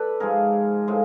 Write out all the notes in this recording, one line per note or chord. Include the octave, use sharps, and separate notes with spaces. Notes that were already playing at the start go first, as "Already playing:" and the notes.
Already playing: A4 B4 D5
G#2 F3 G#3 G#4 A#4
A2 F3 G#3